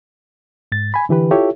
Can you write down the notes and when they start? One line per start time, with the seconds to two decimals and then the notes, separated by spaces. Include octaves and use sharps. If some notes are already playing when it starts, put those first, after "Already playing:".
0.72 G#2 A6
0.94 G#5 B5
1.09 D3 E3 G4 B4
1.31 E4 F4 G4 A4 C#5 E5